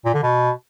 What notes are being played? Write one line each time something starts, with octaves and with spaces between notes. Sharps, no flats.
A#2
D3
B2